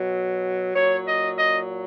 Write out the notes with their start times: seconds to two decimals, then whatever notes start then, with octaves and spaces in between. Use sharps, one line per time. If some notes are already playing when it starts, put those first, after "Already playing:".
Already playing: B2 F#3
0.74 A#2 F#3 C#5
1.07 D#5
1.38 D#5